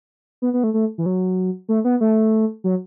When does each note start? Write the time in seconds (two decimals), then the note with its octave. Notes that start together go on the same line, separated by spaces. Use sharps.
0.42 B3
0.54 B3
0.64 A3
0.74 A3
0.98 E3
1.06 F#3
1.69 A3
1.84 B3
2.01 A3
2.64 F#3